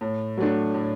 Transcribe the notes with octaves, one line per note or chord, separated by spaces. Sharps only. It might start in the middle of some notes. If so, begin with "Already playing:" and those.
A2
F#3 A3 D4
A2